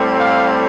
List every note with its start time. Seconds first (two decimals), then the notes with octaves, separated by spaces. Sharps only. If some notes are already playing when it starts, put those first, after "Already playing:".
Already playing: A2 G3 C4
0.15 F5